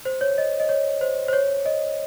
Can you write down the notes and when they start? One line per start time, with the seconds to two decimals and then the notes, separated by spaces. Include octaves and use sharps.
0.05 C5
0.21 C#5
0.38 D#5
0.60 D#5
0.69 C#5
1.01 C5
1.28 C5
1.33 C#5
1.66 D#5